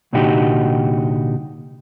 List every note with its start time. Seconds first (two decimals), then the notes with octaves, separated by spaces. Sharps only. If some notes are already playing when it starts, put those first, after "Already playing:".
0.13 C2 A#2 D3 D#4 F#4 G4